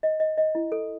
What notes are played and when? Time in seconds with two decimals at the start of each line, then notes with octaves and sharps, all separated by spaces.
0.03 D#5
0.20 D#5
0.38 D#5
0.55 E4
0.72 A4